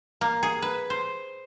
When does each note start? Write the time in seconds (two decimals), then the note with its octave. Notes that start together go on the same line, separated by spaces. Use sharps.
0.21 A#3
0.43 G#4
0.62 B4
0.90 C5